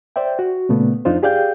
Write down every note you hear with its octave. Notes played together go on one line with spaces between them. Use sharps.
C5 D5 E5 G5
F#4
A#2 C#3 A3 B3
F2 D4 D#4 F4 C5
G4 G#4 D5 F5 G5 G6